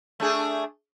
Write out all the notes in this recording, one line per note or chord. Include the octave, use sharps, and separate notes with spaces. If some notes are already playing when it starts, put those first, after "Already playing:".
A3 D4 G#4